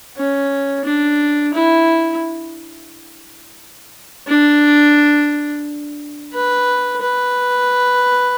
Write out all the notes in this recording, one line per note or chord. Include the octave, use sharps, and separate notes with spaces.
C#4
D4
E4
D4
B4
B4